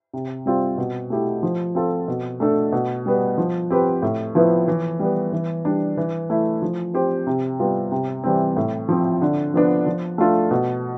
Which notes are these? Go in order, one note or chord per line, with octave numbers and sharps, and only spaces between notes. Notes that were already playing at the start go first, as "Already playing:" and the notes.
C3
G3 C4 F4
B2
A3 E4 G4
F3
C4 F4 A4
B2
A3 D4 A4
B2
G3 B3
F3
C4 G4 B4
A2
F3 B3 E4 B4
E3
G3 B3
E3
G3 D4
E3
A3 E4
F3
C4 G4 C5
C3
G3 B3 F4
C3
E3 G3 C4
A2
F3 C4
D3
F3 B3 D4
F3
A3 D4 F4 A4
B2